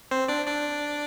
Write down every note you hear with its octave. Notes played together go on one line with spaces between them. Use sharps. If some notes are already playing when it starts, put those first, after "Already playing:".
C4 C5
D4 D5
D4 D5